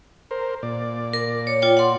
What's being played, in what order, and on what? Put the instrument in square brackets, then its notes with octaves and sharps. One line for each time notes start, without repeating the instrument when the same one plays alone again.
[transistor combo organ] A#4 C5
A#2 D5
[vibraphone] A#4
C#5
F4 C#5 G5
F#5 C6